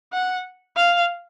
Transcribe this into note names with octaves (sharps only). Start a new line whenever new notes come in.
F#5
F5